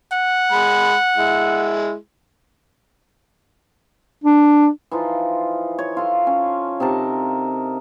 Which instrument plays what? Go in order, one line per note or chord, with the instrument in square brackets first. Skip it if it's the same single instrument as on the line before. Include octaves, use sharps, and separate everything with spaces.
[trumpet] F#5
[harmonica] G#3 B5
G#3 E4
[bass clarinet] D4
[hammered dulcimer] E3 F3 D#4 F4
C#5
F4 A4
C#4
C3 D#4 A#4 A5